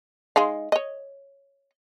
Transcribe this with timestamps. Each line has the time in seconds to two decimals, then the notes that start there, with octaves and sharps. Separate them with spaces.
0.36 G#3 D#4 F5
0.72 C#5 D#5